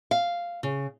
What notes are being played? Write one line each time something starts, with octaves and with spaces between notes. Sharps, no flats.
F5
C#3